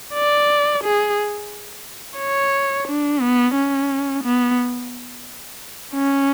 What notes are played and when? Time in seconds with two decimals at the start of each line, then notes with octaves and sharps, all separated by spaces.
0.14 D5
0.83 G#4
2.19 C#5
2.87 D4
3.21 B3
3.55 C#4
4.24 B3
5.94 C#4